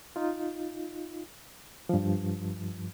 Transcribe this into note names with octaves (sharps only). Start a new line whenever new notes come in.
D#4 F4
G2 F3